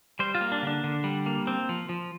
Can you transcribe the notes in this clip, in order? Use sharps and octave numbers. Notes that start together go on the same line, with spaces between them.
G3 C5
F4
A#3
D4
D3 D4
D3
G3
A#3
C4
F3
F3